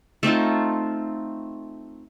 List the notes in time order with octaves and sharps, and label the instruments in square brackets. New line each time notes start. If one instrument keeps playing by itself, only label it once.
[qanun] A3 C4 D#4 F4